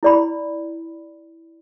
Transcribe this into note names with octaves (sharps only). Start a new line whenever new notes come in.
E4 D5 B5